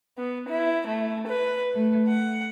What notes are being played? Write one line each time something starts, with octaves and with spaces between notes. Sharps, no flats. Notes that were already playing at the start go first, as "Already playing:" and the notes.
B3
E4
A3
B4
A3
F#5